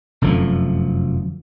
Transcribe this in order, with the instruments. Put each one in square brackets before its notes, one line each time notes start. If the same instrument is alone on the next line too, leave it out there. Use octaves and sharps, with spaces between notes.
[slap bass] F1 F#2 D3 F3